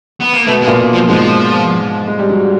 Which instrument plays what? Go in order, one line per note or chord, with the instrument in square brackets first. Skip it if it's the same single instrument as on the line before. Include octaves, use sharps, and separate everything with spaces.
[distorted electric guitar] B3
A#3
[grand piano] B2 B3 [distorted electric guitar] A3
[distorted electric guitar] G#3
[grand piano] A#2 A#3
[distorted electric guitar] F3
[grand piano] G#2 G#3 [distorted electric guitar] F3
[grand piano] G#3
G3
F#3